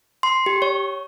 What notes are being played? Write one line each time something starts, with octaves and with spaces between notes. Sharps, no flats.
C6
G4
C#5